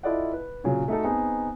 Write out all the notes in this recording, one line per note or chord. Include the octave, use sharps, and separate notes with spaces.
E4 F4 A4 D5 D#5 F#5
B4
A#2 C#3 F#3
A3 D#4 F#4 A4
B3 C4 D#4 G#4